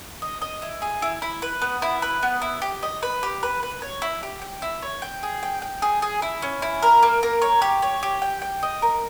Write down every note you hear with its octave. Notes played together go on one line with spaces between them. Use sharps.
D#5
D#5
E4
G#4
E4
E4
B4
B3
E4
B4
B3
E4
G4
D#5
B4
G4
B4
B4
C#5
E4
G4
G5
E4
C#5
G5
G#4
G5
G5
G#4
G#4
E4
C#4
E4
A#4
A#3
A#4
C#5
G4
C#5
G4
G5
G5
D#5
A#4